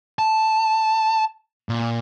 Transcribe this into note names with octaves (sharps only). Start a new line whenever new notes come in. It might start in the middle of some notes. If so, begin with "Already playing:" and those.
A5
A#2